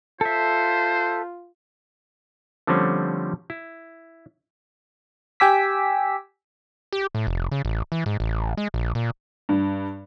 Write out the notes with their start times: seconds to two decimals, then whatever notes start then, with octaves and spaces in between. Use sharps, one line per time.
0.21 F4 A4 C5 E5
2.67 D3 F3 G3 A3 C4 C#4
3.50 E4
5.40 G4 G5 G#5 D6 E6 B6
6.93 G4
7.15 A2
7.27 F1
7.52 C#3
7.65 A1
7.92 E3
8.06 G#2
8.20 A1
8.57 G#3
8.74 A#1
8.95 A#2
9.49 G2